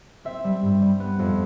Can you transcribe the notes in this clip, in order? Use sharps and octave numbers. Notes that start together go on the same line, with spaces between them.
C4 E5
G3
G2
G3
B3
F2